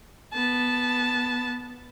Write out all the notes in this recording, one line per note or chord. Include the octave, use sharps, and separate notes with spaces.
B3 A5